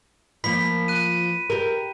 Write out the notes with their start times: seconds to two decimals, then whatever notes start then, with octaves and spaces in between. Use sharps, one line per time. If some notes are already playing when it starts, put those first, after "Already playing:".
0.44 F3 A#3 B5 B6
0.88 F#6 D#7
1.50 G4 A#4